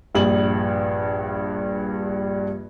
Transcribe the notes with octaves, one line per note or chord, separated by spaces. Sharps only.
A#1 G2 G3 F#7